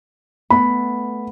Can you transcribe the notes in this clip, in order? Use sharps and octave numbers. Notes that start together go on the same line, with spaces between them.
A3 B3 B5